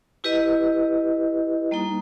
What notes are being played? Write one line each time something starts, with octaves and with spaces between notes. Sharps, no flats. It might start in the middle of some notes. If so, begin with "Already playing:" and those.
E4 G4 B4 D#5
G3 A#3 D#4